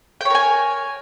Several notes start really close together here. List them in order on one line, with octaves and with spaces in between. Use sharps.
G5 C#5 A#4 G#5